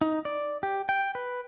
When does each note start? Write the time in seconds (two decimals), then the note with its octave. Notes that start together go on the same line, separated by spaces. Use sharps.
0.01 D#4
0.25 D5
0.63 G4
0.89 G5
1.15 B4